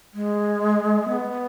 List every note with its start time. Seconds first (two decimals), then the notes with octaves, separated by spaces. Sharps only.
0.14 G#3
1.08 B3